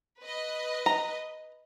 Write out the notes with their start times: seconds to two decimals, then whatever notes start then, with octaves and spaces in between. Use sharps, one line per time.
0.23 B4 D#5
0.86 A#5